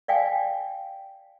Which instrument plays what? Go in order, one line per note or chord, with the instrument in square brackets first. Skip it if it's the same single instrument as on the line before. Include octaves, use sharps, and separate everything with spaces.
[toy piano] D5 F5 G5 G#5